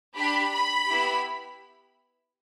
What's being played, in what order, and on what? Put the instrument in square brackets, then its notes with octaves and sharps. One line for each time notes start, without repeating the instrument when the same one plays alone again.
[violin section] D4 G4 B5
B5
B3 E4 G4